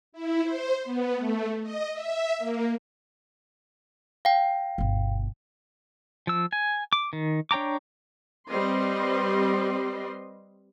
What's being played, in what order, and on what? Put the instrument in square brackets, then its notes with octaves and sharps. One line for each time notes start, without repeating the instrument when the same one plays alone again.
[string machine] E4
C5
B3
A3
D#5
E5
A#3
[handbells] F5 G5
[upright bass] G1 B2
[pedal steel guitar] F3 E6
G#5
D6
D#3
D4 C#5 G5 A#5 D6
[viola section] G3 C4 B4 D#5 C6